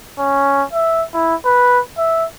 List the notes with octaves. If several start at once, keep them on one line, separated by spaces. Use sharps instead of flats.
C#4
E5
E4
B4
E5